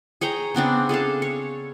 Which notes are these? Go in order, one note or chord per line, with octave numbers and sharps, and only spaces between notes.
G#4 C#5 G5 A#5
C#3 B3 C4 D4
G#4 A4 F5 A5
C#5